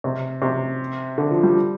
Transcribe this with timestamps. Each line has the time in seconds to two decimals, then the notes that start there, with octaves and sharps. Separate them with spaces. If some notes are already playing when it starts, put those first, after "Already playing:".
0.04 C3
0.42 C3
1.18 D3
1.31 F3
1.43 G3